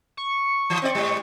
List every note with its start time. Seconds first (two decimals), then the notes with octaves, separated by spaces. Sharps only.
0.17 C#6
0.70 E3
0.82 C4 E4 D5
0.95 G#2 G3